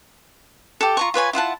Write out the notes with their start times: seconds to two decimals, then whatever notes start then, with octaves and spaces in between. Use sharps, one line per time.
0.81 G4 A4
0.97 F4 A#5 C#6
1.14 F4 B4 C#5 G#5
1.33 E4 F4 F#5 A5